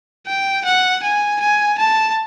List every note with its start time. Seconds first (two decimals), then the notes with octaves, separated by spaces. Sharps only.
0.27 G5
0.65 F#5
1.03 G#5
1.40 G#5
1.78 A5